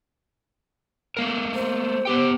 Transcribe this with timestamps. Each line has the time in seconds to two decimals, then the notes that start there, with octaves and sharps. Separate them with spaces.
1.17 A3 A#3 A#4
1.55 C5
2.05 B3 G4 G5